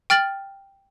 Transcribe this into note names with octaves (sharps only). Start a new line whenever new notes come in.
G5 F6 A6 F#7